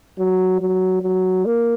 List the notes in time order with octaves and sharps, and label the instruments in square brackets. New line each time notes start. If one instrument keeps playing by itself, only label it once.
[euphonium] F#3
F#3
F#3
A#3